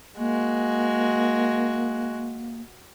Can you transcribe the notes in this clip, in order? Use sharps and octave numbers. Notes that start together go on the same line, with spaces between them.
G#3 A#3 F#4